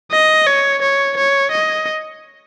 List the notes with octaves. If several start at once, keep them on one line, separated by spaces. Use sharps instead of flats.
D#5
C#5
C#5
C#5
D#5